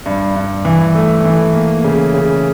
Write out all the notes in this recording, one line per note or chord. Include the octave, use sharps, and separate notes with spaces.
G2
G2
E3
A3
E3
A#3
C#3
C#3